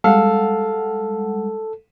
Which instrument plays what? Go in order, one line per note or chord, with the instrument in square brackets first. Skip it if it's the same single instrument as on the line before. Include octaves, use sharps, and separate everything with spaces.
[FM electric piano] G3 G#3 F#5 [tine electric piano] A4 [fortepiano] F5